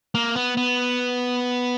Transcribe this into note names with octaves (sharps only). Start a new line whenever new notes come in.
A#3
B3
B3